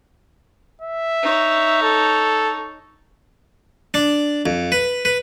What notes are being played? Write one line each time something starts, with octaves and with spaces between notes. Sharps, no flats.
E5
D#4 C#5
A4
D4
F2
B4
B4